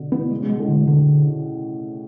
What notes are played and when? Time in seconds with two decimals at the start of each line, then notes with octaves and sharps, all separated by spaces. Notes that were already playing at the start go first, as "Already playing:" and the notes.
Already playing: B2 D3
0.12 E3 B3
0.31 G#3
0.40 C#3
0.49 B2 G#3
0.59 A2
0.68 D3
0.87 D3